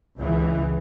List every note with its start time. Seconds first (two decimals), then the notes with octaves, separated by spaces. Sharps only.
0.17 C#2 E3